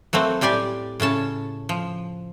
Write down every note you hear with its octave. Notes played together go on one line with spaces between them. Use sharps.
F#3 A3 A#3 C4
A2 G3 G4 D5 G#5
A2 C#3 C#4 A5
F3